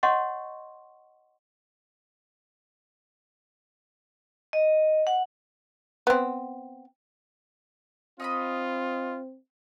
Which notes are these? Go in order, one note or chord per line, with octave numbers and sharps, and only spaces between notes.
C#5 D#5 F#5 C6 C#6
D#5
F#5
B3 C4
C4 D#4 F4 D#5 B5